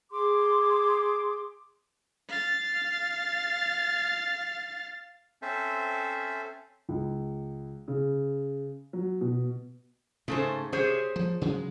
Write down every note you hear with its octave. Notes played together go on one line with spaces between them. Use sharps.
G#4 C6 D6
F5 A6
C4 C#4 A4 C5 E5
C#2
C#3
F#3
B2
G#2 C#3 A3 C5
C3 G#4 C5 C#5
F3
C#3 F#3 G#3